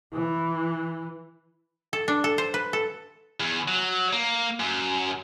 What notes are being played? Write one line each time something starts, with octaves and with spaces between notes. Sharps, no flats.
E3
A4
D4
A4
C5
B4
A4
E2
F#3
A#3
F#2